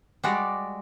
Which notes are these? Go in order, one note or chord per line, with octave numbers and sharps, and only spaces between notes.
G3 G#3 F#4 D5